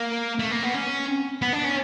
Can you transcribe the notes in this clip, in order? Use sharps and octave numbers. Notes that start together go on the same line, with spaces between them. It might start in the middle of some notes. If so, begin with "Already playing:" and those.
Already playing: A#3
A3
A#3
B3
C#4
B3
D4
C#4